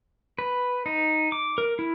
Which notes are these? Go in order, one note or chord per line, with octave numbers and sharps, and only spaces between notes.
B4
D#4
D6
A#4
E4